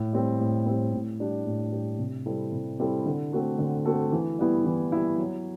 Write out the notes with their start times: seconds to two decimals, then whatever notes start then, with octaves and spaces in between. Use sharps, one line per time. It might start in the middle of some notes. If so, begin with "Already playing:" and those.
Already playing: A2
0.13 G3 C4
0.40 A2
0.66 G3 C4
0.93 A2
1.19 G3 D4 G4
1.46 A2
1.72 G3 D4 G4
1.99 C3
2.26 G3 C4 E4 A4
2.52 C3
2.79 G3 C4 E4 A4
3.06 D3
3.32 A3 C4 F#4 A4
3.59 D3
3.85 A3 C4 F#4 A4
4.12 E3
4.39 G3 B3 E4
4.65 E3
4.92 G3 B3 E4
5.18 F#3